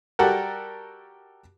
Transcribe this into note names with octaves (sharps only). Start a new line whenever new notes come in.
G3 F#4 G4 A4 A#4 F#5